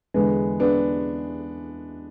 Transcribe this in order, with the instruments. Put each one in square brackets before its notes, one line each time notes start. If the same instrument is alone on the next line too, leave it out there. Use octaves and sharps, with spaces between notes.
[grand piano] E2 D3 G#3 B3
B3 D4